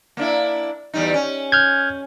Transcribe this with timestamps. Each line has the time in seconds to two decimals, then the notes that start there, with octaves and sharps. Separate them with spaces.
0.17 A#3 D4 E4
0.94 E2 G3 D#4
1.14 C#4
1.52 F6 G6 G#6